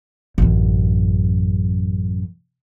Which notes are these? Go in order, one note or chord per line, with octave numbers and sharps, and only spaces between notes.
A1 F#2